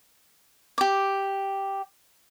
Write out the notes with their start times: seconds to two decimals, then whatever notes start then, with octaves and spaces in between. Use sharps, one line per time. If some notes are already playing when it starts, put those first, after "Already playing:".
0.78 G4 D6